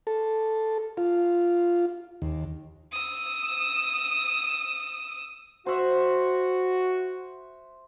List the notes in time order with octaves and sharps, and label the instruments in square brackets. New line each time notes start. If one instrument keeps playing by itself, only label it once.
[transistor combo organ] A4
F4
D#2
[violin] D#6 E6
[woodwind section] F#4 [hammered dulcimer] C5 E5